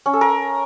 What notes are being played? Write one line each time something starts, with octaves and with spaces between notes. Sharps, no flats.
C#4
A4
A#4